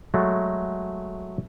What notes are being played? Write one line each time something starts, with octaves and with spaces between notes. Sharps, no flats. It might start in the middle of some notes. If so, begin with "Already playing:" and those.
F#3 G#3 A3